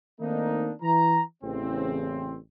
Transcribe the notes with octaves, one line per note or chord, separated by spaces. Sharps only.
D#3 A3 A#3 C4 D4 D#4
E3 A#5
A1 E2 C#3 E3 C4